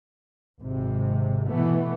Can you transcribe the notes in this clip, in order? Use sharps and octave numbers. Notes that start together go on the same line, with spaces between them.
G#1 C3
B2 E3 A3 B3